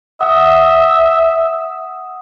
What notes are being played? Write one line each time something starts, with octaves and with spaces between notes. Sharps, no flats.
E5 F#5 D#6